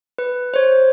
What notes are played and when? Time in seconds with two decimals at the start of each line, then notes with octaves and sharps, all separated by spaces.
0.18 B4
0.54 C5 C#5